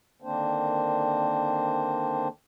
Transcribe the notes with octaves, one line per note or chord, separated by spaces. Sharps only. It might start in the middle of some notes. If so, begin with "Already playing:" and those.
D3 D#3 A#3 C4 D4 C5